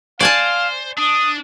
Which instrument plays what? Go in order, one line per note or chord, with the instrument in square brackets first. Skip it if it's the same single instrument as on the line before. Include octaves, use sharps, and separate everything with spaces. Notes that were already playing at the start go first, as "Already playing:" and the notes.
[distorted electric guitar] C5 [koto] D5 G#5 A5 [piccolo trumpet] F5
[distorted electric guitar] D4 [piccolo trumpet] D#6